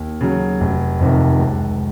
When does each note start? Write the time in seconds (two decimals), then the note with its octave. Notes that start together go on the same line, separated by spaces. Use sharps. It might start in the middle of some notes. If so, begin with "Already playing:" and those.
Already playing: D#2
0.21 C#3 F#3
0.60 F1
1.00 F2 C3 D#3
1.39 C#2